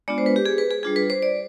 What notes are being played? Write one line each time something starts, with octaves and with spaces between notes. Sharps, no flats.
G#3 B3 D4 F4 D5
C5
B4
G4
G#4
B4
G#4
G3 D4 F4 G#4
B4
C5
D5